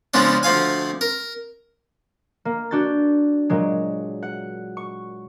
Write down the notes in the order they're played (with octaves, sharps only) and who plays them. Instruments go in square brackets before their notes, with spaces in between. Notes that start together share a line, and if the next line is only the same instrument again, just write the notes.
[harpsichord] C#3 F3 G#3 B3 C#4 D4
D2 F3 F5 G#5
A#4
[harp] A#3
D4 F#4 G6 A6
A#2 F#3 G#3
F#5
C#6